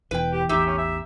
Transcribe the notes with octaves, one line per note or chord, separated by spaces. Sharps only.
E1 E2 E3 B4 G5
G4
A1 E2 D#4 G4 E5
C#4
E5